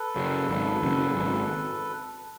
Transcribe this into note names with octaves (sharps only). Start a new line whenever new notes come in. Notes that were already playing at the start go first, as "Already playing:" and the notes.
Already playing: A4 B4
F#2 C#3
G#1
F#2 C#3
G#1